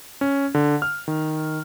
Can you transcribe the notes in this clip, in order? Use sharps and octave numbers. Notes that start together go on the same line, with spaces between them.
C#4
D3
F6
D#3